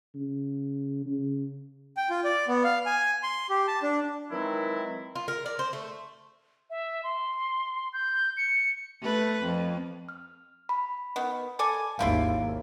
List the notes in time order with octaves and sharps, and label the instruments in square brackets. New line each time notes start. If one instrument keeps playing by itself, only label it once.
[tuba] C#3
C#3
[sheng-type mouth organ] G5
F4
D5
B3
F5
G#5
C6
G4
A5
D4
[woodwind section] D#3 E3 F#3 G#3 C4 E4
[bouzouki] F4
A#4
D5
C5
A3
[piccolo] E5
C6
G6
C#7
[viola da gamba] A3 B4
F2
[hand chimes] F6
B5
[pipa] D#3 B3
A4 D5 G#5
[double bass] G#1 D#2 [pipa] C4 E4 F4 [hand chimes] F5 D7